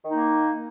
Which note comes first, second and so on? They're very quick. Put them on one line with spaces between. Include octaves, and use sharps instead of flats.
D#3 D#4 A#3